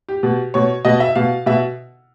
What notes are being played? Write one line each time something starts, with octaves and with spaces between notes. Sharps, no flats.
G4
B2
B2 C#5
B2 D#5
E5
B2 F5
B2 E5